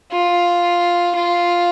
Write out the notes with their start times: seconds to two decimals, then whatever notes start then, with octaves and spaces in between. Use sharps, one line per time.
0.12 F4
1.16 F4